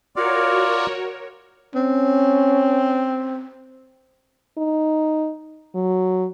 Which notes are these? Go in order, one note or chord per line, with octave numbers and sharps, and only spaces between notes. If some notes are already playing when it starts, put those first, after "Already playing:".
F4 F#4 A#4 C#5 D5 F5
C4 C#4
D#4
F#3